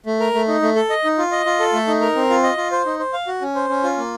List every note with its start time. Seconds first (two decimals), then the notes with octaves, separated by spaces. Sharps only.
0.06 A3
0.20 A#4
0.34 A3
0.48 D#4
0.62 A3
0.76 A4
0.90 D#5
1.04 D#4
1.18 F4
1.32 D#5
1.46 F4
1.60 A4
1.73 A3
1.88 D#4
2.01 A#4
2.16 C4
2.30 F4
2.43 D#5
2.57 F4
2.71 C5
2.86 D#4
2.99 C5
3.13 F5
3.27 F#4
3.41 C#4
3.55 C5
3.69 C#4
3.84 F4
3.97 A#3